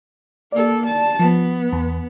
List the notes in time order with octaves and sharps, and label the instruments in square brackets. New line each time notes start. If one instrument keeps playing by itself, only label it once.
[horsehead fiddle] A#3 A4 [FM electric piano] D5
[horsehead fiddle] A5
[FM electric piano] F3 [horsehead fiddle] B3
[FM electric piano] E2